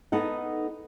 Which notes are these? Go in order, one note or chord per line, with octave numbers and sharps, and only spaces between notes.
B3 D#4 A4 F#5